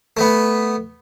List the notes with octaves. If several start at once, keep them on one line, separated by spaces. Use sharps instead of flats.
A3 B3